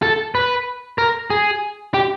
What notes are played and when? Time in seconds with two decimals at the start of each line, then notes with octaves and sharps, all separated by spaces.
0.02 A4
0.35 B4
0.98 A#4
1.30 G#4
1.94 G4